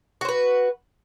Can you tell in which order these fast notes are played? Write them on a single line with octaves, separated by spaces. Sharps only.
F#4 C5 B4